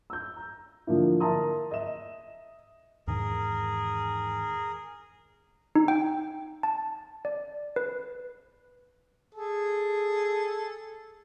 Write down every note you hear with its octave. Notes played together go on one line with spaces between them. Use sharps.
E6 G6
A#5
D3 F3 A#3 E4
A#4 E5 A5 A#5 C6 D#6
D#5 E5 E7
E2 G#2 D#3 G#4 A#4
D#4
G5
A5
D5
B4
G#4 A4